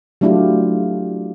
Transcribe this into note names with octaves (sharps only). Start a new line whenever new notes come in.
F#3 A3 D4 E4 F4 G4